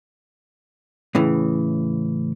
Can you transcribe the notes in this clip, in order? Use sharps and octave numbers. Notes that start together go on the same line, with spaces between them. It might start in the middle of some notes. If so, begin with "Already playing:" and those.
A2 C#3 E3